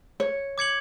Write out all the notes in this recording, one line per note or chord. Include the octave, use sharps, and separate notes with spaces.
C#5
D6 G#6 C#7 F#7